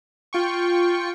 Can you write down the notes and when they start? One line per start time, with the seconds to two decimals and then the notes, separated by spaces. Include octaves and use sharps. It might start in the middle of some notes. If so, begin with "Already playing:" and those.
0.33 F4 G5 C#6